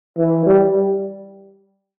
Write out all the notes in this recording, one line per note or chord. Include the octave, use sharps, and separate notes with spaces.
E3
G3